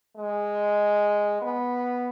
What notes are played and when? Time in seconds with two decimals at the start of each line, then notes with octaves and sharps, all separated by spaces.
0.16 G#3
1.41 B3